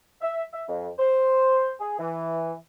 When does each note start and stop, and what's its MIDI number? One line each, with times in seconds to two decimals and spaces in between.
0.22 0.43 76
0.53 0.64 76
0.69 0.89 41
0.99 1.72 72
1.80 1.96 68
1.99 2.53 52